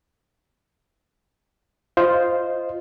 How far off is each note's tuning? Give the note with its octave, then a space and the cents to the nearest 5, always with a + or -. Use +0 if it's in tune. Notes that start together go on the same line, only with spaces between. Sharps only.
F4 +0 C5 +0 D#5 +0